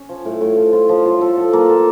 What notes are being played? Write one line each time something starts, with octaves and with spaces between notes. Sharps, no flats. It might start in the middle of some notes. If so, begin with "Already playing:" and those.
Already playing: C#4
F3
A2
A2
F3
F4
F3
F4
A4
A4
A#3
A4